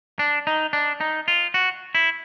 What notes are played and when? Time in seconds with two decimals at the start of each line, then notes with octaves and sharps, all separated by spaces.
0.19 D4
0.47 D#4
0.73 D4
1.01 D#4
1.28 F4
1.54 F#4
1.95 E4